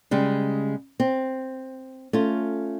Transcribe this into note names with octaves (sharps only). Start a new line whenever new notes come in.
C#3 G3 G#3
C4
A3 C#4 F4